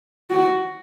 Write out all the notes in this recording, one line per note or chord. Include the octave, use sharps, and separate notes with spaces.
F#4